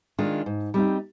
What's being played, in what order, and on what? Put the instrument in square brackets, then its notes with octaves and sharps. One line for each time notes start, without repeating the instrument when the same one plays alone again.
[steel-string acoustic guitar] D#3 G#3 D4 F4
G#2
G3 C4 D#4